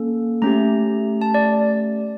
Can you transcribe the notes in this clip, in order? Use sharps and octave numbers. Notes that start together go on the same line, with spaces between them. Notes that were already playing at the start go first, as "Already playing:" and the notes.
Already playing: A#3 C#4 A4
A3 C#4 G4 A#5
A5
D5